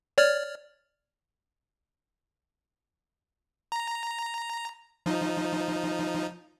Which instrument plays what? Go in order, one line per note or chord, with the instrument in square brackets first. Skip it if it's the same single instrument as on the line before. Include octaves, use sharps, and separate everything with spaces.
[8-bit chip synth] C#5 D5 F6
A#5
F3 D#4